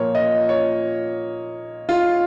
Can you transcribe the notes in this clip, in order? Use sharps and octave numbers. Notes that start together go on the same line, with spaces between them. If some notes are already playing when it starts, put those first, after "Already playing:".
Already playing: A#2 F3 A#3 C#5
D#5
C#5
F4